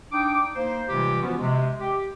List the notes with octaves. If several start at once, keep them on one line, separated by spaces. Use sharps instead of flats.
D4 D#4 G5 D6
A#3 D#4 C5
C3 E3 G3 G#3 F4 G4
E3 F3 B3 C#4 F4 F#4
C3 G#3
G4